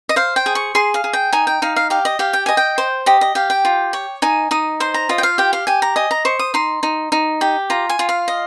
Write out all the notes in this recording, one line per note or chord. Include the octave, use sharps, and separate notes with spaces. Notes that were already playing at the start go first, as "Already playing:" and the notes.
D#5
C5 F5
G5
G#4
C#6
G#4 C6
F5
G#4
G5
D#4 G#5
G5
D#4 F5
F5
G4 F5
D#5
G4 F5
G5
D#5 G#5
G5
C5
G4 D#5
D#5
G4 F5
G5
F4
C#5
D#4 G#5
D#4 D#6
C5 C6
A#5
F4 D#5
G5
F5
G4 G5
F5
G4 G#5
A#5
D#5 G#5
A#5
C5 C#6
D#6
D#4 C6
D#4
D#4
G4
F4 A#5
G#5
F4
F5
D#5